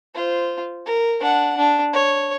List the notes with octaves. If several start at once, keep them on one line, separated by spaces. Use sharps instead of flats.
F4 C5
A#4
D4 F#5
D4
C#5